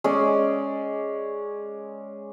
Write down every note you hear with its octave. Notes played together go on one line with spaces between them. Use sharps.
G#3 C#4 D5